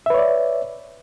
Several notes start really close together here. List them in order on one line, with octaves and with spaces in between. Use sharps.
E5 B4 C#5 D5